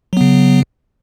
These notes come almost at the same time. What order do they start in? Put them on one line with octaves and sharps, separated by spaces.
F#3 B3 C#3